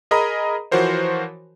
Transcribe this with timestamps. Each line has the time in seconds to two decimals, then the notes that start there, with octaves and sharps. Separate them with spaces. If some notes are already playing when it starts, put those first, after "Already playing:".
0.11 G#4 A#4 D#5 A#5 B5 D#6
0.71 E3 F3 F#4 A#4 C5 C#5